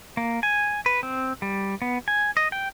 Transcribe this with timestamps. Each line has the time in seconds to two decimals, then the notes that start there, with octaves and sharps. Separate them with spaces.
0.17 A#3
0.43 G#5
0.86 B4
1.03 C4
1.42 G3
1.82 B3
2.08 G#5
2.37 D#5
2.52 G5